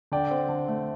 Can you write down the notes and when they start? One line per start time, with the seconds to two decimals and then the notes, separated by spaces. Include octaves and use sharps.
0.12 D3 D5 G5
0.31 C4
0.49 D3
0.68 A3